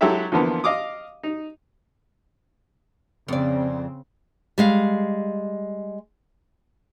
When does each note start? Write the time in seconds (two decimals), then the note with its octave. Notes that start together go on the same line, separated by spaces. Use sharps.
0.01 F#3 G#3 E4 G4 A4 E5
0.32 E2 D3 E3 F3 A#3 B3
0.64 D#5 F5 D6 D#6
1.23 D#4
3.28 F2 C#3 C4 D5
4.58 G3 G#3 F5